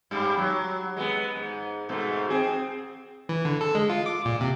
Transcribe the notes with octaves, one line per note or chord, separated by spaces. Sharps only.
G2 G3
F#3
G#3 B3
G#2
G#2 B2 A3
C4 G#4
E3
D3
A4
G#3
F4
D6
A#2
C3